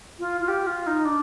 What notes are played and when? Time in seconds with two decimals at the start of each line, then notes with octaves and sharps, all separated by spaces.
0.20 F4
0.41 F4
0.48 G4
0.67 F4
0.87 D#4
1.05 D4